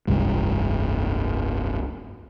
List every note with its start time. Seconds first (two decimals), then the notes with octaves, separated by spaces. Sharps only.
0.07 F1 C2 G2 G#3